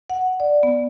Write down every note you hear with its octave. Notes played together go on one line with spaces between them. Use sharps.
F#5
D5
B3